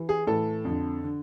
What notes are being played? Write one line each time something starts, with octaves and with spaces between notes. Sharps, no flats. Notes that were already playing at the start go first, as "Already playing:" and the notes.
Already playing: E3
G#4
A2 E3 A4
F2 D3
D3